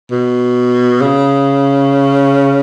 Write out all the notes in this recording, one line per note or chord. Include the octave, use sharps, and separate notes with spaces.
B2
C#3